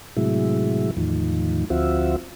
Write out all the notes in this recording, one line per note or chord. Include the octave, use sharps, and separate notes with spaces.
A2 C3 F#3 G#3 E4
E2 A2 D#3 F3
D2 F3 C4 F4 F#4 E5